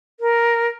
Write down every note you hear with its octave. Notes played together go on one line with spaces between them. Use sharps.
A#4